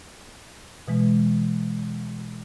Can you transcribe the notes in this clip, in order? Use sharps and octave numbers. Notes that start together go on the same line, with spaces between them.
B2 E3 G#3